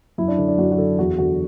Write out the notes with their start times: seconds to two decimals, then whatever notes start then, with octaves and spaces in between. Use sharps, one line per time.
0.18 F#2 E4
0.28 D4
0.38 D3
0.48 D4
0.58 F#2 F#4
0.72 F#4
0.78 D3 A4
0.98 E2 F#4
1.18 D3 F#4